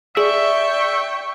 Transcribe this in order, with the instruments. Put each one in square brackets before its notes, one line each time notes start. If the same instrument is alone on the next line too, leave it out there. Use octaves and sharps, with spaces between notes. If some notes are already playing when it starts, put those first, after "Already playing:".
[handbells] G#4 [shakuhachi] D5 [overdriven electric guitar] E5 [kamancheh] G5 C#6